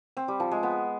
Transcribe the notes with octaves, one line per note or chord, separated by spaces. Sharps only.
C4
G3
F3
G#3
B3